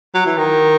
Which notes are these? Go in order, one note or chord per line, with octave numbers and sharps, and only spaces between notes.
F#3
E3
D#3